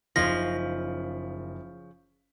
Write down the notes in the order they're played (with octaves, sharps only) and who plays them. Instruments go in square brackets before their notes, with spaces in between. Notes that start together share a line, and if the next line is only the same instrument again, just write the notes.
[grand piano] F#1 D#4 B6 [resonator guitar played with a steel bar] C#3 F3 [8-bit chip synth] A#6